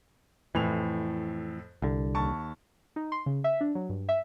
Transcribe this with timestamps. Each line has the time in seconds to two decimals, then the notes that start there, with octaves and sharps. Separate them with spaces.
0.55 F2 A2 E3 F7
1.82 C2 D3
2.15 D#2 A5 C#6
2.96 D#4
3.12 C6
3.26 C#3
3.44 E5
3.61 D4
3.75 F#3
3.89 G2
4.09 E5